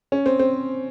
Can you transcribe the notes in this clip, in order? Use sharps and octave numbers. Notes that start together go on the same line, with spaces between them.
C#4
C4
C4